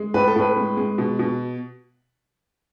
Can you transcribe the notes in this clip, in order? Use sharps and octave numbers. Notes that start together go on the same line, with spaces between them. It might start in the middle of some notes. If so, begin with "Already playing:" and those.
Already playing: G#3
A2 B4
A4
A2 B4
G#3
G#3
B2
B2